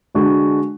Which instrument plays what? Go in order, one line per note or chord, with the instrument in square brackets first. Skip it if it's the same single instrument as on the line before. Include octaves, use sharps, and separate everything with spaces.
[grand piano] D3 G#3 D4 F#4